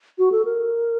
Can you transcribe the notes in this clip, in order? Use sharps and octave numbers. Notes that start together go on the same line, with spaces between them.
F#4
A4
A#4